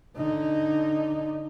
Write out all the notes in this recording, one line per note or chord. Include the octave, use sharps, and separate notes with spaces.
D3 D#4